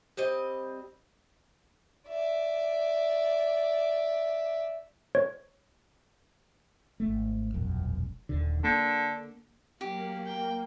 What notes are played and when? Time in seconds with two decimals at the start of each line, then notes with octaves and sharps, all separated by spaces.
0.17 G3 C4 D#5
2.08 D5 E5
5.15 C#5
7.00 G#1 A3
7.54 E1 A#1 F#2
8.29 D#1 D#2 D3
8.64 D3 A#3
9.81 F#3 A#3 G4
10.27 G5